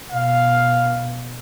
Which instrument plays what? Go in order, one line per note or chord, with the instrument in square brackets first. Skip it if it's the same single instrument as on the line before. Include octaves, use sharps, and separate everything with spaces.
[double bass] B2 [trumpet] F5